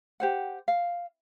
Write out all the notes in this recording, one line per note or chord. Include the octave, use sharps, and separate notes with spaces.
G4 C5 F#5
F5